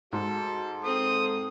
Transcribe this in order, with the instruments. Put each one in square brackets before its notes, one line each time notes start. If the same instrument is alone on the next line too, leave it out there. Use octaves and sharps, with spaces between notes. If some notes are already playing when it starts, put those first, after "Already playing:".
[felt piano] G#2 [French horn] F#4 [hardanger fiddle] A4
[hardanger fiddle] C4 [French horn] A4 [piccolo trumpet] D#6